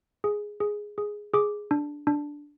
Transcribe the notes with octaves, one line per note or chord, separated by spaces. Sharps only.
G#4
G#4
G#4
G#4 D6
D4
D4